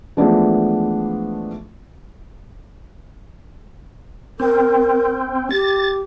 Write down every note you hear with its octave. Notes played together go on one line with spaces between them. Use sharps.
E3 F3 G#3 A3 B3 D4
C4 A#4
G4 A6